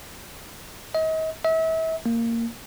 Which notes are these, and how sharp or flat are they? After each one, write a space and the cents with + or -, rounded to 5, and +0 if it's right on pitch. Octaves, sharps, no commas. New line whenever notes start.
D#5 +40
E5 -35
A#3 -15